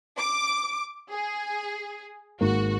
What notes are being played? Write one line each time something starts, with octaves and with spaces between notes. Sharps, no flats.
D6
G#4
G#1 G#2 A#3 F#4